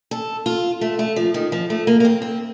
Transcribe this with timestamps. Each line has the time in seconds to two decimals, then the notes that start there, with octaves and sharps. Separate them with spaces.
0.11 A4
0.46 F4
0.81 A3
0.99 A3
1.16 F3
1.34 D#3
1.52 F3
1.70 A3
1.87 A#3
2.00 A#3
2.05 C4
2.22 C4